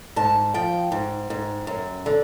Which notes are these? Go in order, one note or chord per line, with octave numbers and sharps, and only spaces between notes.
G#2 A5
F3 G5
G#2
G#2
F#2
D3